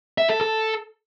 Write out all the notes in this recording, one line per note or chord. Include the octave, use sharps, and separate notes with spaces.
E5
A4
A4